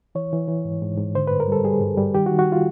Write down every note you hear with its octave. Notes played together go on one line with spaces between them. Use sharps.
E3 C#5
E3
E3
G#2
G#2
G#2
D3 C5
G2 B4
A#4
G3 A4
G3 G#4
G2
G3
D#3 G4
F#4
D#3
F#4
F4